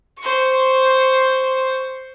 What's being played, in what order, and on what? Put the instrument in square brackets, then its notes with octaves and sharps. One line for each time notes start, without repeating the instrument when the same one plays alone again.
[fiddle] C5 C#6